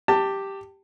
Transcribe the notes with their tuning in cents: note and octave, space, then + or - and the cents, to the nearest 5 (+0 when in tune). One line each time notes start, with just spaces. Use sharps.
G4 +0 A5 +20